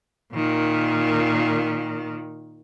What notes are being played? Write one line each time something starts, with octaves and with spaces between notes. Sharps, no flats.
A#2 D#3